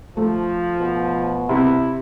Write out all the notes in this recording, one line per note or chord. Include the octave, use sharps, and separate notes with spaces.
F3 A3
B2
C3 E4